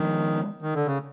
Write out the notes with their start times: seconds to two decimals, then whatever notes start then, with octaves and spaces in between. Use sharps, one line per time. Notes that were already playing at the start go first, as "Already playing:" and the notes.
Already playing: D#3 F3 G#3 B3 D4
0.62 D#3
0.75 D3
0.86 C#3